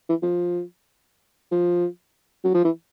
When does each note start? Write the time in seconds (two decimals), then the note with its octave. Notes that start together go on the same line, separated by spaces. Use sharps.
0.09 E3
0.23 F3
1.52 F3
2.44 F#3
2.54 F3
2.64 E3